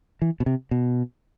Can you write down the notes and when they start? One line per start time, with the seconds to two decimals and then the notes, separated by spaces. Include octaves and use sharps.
0.22 E3
0.40 B2
0.46 C3
0.71 B2